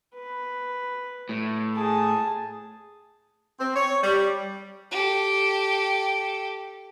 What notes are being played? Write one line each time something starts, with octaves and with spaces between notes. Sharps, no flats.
B4
A2
G#4 A5
C4
C#5
G3
G4 A4